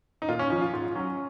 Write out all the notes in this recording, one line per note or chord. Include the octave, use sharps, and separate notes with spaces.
D#4
A#2 F4
C#4
F3 C#4
F4
G#2 F4
F#3 C#4